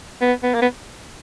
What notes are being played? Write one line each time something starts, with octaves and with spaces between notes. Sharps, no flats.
B3
B3
A#3
B3